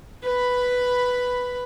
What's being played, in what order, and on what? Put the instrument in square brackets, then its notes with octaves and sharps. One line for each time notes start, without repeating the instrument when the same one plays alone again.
[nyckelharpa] B4 B5